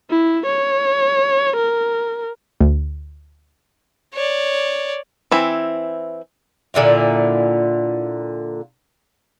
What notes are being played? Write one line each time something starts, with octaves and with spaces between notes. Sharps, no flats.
E4
C#5
A#4
D2
C#5 D5
E3 C4 E4
A#2 D3 E4 F4